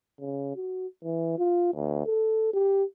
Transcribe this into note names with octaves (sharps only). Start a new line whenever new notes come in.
C#3
F#4
E3
F4
D2
A4
G4